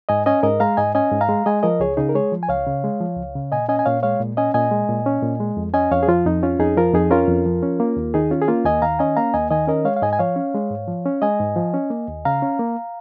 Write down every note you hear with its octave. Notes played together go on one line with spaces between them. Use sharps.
G#2 D#5 G#5
C#4 D#5 G#5
G#2 A#4 D#5
G#3 F5 A#5
G#2 D#5 G#5
C#4 D#5 G#5
G#2
F5 A#5
G#3
G#3 D#5 G#5
F3 A#4 D#5
C#2 G#4 C#5
C#3 D#4 G#4
A#4
G#3 G#4 C#5
F3
G#5
C#2 C#5 F5
C#3
G#3
F3
C#2
C#3
A#2 D#5 G#5
C#4 D#5 G#5
G#5
A#2 C#5 F5
G#3 C#5 F5
A#2
C#4 D#5 G#5
A#2 D#5 G#5
G#3
A#2
C#4
A#2
G#3
F2
C#4 D#5 G#5
F2 C#5 F5
G#4
F3 F4
F2 D#4
C#4 F4
F2 D#4 G#4
F3 F4 A#4
F2 D#4 G#4
C#4 F4 A#4
F2
F3
C#4
A#3
D#2
D#3 D#4 G#4
C#4 F4
G#4
A#3 F4
D#2 D#5 G#5
D#3 F5 A#5
C#4 D#5 G#5
A#3 F5 A#5
D#2 D#5 G#5
D#3 D#5 G#5
C#4 A#4 D#5
G#3 C#5 F5
F5
G#2 D#5 G#5
G#5
F3 C#5 F5
C#4
G#3
G#2
F3
C#4
G#3 D#5 G#5
G#2
F3
C#4
A#3
D#2
C#3 F5 A#5
C#4
A#3